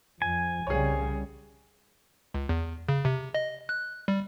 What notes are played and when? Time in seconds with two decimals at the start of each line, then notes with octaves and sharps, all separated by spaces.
0.22 F2 G#5
0.67 C2 C#3 G3 G#4 C#5
2.34 C#2
2.49 E2
2.89 C#3
3.05 C3
3.34 D#5
3.69 F#6
4.08 G3